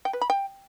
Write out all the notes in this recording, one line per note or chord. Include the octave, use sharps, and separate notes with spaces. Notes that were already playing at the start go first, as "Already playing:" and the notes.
G5
B4
B5
G5